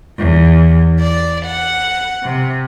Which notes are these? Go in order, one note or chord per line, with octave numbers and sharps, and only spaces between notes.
E2
D5
F#5
C3